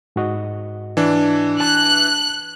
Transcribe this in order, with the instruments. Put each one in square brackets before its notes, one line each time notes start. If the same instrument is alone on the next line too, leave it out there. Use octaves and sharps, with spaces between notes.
[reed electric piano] G#2 F#4 D#5
[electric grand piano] E3 D4
[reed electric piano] A5 [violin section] F#6